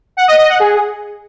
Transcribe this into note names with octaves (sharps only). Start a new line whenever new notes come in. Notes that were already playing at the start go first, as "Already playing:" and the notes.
F#5
D#5
D#5
F#5
G#4